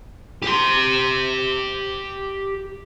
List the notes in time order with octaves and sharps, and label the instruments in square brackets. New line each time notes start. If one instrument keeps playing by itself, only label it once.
[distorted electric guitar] G4 C6